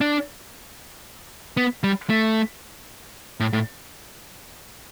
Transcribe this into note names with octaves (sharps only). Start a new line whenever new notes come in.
D4
B3
G3
A3
A2
A2